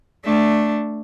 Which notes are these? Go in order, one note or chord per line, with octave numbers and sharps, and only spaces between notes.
A3 D4